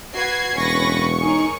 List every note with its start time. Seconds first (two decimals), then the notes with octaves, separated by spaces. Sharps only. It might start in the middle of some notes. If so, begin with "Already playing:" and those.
0.13 F#4 B4 G#6 C7
0.56 E1 C#4 B4 C#6 A#6
1.23 D#4 G#4 A#4 C#5